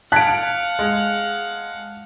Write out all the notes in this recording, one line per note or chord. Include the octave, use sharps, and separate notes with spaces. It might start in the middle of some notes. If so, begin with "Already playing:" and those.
F5 F#5 A5 F#6 G#6 B6 D7
G#3